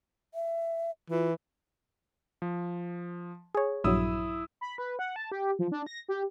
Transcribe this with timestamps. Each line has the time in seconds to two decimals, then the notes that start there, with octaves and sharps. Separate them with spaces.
0.34 E5
1.10 E3 F4
2.42 F3
3.55 G#4 C#5
3.84 A#1 G2 F#3 E4 D#6 E6
4.61 B5
4.78 B4
4.99 F#5
5.16 A5
5.32 G4
5.59 F3
5.72 D4
5.86 A#6
6.08 G4